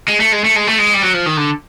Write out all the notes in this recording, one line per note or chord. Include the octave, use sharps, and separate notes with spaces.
G#3
A3
G#3
A3
G#3
A3
G#3
G3
F#3
F3
D#3
D3